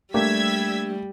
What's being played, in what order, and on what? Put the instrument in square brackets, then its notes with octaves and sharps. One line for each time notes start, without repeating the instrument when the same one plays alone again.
[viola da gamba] G3 [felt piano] A3 [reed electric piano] A#3 D4 G4 [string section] E6 G#6 B6